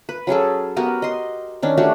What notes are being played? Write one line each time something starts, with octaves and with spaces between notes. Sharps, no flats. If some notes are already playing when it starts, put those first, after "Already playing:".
B4
F#3 C#4 G#4 A4
B3 F#4 G4 A#4
D#5 C6
D#3 C#4 D4
A3 D4 F#4 G4